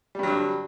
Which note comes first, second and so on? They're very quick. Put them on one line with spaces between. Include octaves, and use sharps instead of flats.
G3 G2 F#3 D3